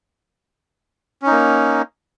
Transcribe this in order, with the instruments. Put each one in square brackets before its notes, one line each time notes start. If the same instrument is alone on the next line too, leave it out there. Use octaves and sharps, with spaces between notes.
[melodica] C#4
D#4
A#3